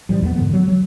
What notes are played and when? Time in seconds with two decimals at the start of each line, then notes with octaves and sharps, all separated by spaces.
0.09 A1 F3 G3
0.21 E2 A3 B3
0.36 G#2 D3 D#3 B3
0.53 F#3
0.68 F#3